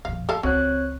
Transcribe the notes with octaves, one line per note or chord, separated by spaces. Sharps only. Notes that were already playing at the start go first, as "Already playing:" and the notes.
F2 A#2 F5
A2 A4 F5 A5
C#2 F#3 C4 C#5 F#6